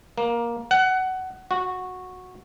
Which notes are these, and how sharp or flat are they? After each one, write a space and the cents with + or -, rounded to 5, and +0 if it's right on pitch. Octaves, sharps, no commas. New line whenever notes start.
A#3 +15
F#5 +20
F#4 -10